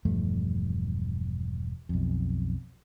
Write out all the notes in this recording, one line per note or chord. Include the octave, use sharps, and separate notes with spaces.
E1 G2 F3 A3
B1 F2